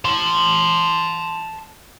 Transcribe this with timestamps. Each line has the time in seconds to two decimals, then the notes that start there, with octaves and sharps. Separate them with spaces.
0.05 A5 C6